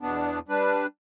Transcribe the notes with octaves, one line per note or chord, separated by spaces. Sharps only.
E2 B2 B3 D4
G3 D4 B4